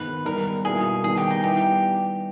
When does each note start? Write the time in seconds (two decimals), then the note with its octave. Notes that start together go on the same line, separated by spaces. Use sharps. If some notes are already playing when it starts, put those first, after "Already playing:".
Already playing: G#2 D#3 G#3 B3 B4
0.25 D#3 G3 B3 A#4
0.64 B2 G3 A#3 E4 G#4
1.04 D#3 G3 B3 D#4 G#4
1.17 G4
1.30 D#4
1.43 G3 B3 E4 G4